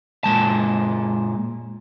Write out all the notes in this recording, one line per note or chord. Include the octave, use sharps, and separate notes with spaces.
A#2 G#3 A5